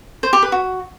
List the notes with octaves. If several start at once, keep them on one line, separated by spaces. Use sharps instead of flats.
C5
G4
B4
F#4